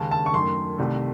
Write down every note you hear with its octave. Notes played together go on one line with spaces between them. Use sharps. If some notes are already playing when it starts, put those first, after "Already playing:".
Already playing: D#2 C#3 G#3 C#4 A5
A5
C#6
F#2 D#3 A3 C6
C2 C3 D#3 A3